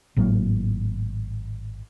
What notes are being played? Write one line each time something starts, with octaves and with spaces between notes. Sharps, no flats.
G#1 A2 F#3 A#3